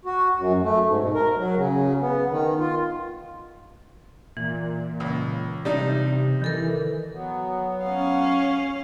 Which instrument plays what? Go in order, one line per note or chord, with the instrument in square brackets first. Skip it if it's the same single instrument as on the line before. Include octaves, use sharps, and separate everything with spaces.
[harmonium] F#4
F#2
A3
G#2
B2
A#4
F#3
C#3
B3
D#3
F4
[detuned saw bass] A#2 [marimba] E3
[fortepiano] C#2
[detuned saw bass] C3 [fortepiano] G3 D4 D#4
[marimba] D#3 A4 A#4 [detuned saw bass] E3
[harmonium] F#3 B3
[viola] C#4 F5